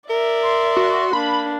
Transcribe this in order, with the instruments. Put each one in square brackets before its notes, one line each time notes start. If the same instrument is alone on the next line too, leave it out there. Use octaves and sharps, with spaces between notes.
[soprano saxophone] A#4 [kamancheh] D5 E5
[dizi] C6
[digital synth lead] F#4
[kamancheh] A#3 D4 [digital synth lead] B5